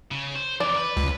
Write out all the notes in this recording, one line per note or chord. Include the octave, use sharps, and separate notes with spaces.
C#3
C5
F2 E3 D5
A#4 B4
C#2